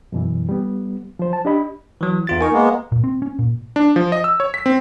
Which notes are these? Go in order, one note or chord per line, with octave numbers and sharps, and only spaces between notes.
F#2 B2 E3
G3 B3
F3 C5
A5
D4 G4 D#5 B5
E3 F#3
E2 F4 A6
D#4 A#4 G#5 C#6
G#3 A#3 B3
A#2
C4
C#4
A#2
D4
F3
D#5
E6
C#5
B6
C4